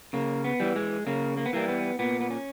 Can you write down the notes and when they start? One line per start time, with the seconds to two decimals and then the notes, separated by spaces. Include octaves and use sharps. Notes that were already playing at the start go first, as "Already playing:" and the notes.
0.13 C#3 A#3
0.44 B3
0.60 E3 G3
0.76 G#3
1.07 C#3 A#3
1.37 A#3
1.46 B3
1.53 E3 G3 A#3
1.68 B3
1.99 A#2 B3
2.20 B3
2.30 C#4